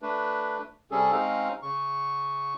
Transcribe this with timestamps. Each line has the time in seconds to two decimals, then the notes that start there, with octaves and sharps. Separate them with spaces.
0.02 A3 D4 B4
0.91 C3 G3 C#4 G#4 A4
1.12 G#3 C4 C#4 D#4 F5
1.63 C#3 C#6